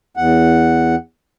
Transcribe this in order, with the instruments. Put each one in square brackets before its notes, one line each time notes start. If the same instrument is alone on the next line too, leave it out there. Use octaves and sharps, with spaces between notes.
[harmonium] E2 F#5